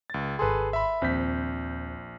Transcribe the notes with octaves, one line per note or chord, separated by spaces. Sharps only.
C#2 A6
G#1 G#4 A4 B4 C6
E5 B5
A#1 D#2 C4 G6 B6